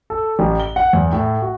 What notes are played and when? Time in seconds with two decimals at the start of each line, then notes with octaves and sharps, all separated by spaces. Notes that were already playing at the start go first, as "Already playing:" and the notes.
0.10 A4
0.39 A1
0.60 G7
0.76 F#5
0.93 E2
1.12 A2
1.42 F#4